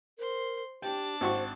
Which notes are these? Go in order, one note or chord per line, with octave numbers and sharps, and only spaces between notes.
A#4 C5 C6
D4 G4 G5 A5
G#1 F#4 C5 C#6